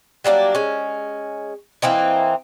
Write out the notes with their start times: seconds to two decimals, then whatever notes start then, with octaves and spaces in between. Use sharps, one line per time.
0.24 F#3 G3 A#3 D4
0.55 G#3 C#4
1.82 E3 A#3 C4 D#4